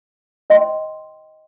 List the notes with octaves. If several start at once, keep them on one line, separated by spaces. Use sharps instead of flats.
C5 D#5 G5 C6